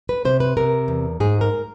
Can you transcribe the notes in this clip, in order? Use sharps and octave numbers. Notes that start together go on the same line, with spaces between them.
B4
C3 C5
B4
C3 A#4
E2
G#2 G#4
A#4